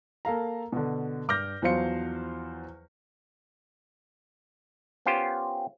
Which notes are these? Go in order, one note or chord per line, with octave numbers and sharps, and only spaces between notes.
A#3 A4 F5 A#5
B2 D3
G2 D6 F6 G6 A#6
E2 F3 F#3 C5 F5 C#7
B3 C#4 F4 G4 C5